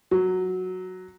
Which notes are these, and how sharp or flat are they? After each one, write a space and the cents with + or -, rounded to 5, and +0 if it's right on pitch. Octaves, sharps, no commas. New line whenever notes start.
F#3 -5